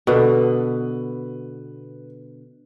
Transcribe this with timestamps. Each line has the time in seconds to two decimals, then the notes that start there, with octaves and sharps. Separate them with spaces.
0.07 B2 D3 B4